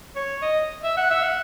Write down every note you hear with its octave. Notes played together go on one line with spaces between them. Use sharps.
C#5
D#5
E5
F#5
E5
F#5